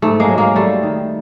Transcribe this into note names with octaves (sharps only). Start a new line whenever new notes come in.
G#2 A3
G#3 A#3
F#3
G#3 A#3
G3 A3
D#3